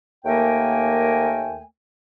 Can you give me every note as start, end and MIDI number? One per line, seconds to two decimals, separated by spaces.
0.24 1.62 39
0.24 1.62 57
0.24 1.62 58
0.24 1.62 70
0.24 1.62 79
0.24 1.62 80